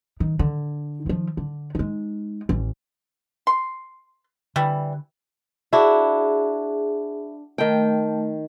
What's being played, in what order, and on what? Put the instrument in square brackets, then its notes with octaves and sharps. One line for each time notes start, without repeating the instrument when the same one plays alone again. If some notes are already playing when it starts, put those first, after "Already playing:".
[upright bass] D#3
D3
D#3 F3
D3
G#3 D#4
A1
[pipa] C6
[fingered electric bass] D3 [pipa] E3 G3 E4
[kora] D4 E4 F#4 [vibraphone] G#4
[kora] D#3 G5 [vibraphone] A3